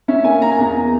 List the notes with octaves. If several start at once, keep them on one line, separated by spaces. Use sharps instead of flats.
C#4 E5
A#3 G#5
A#3 A#5
G#5
E2 A#5